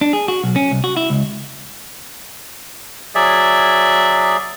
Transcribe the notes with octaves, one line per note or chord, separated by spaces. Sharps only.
D4
G#4
F#4
B1
C#4
C2
F#4
E4
C#2
F#3 G#4 D5 E5